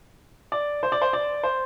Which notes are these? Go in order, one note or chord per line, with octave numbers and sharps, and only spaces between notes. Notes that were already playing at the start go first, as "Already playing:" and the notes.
D5
C5
D5
C5
D5
C5